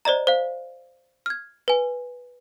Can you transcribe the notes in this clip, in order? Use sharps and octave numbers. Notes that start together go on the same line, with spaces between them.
C5 D5 D#5 A#5
C5 F5
F6 G#6
B4 G#5